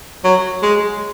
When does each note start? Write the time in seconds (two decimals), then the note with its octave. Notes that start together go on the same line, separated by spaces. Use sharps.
0.24 F#3
0.62 G#3